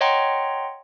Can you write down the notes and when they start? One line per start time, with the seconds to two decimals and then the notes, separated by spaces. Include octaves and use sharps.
0.01 C#5 D#5 F#5 G5 A#5 C6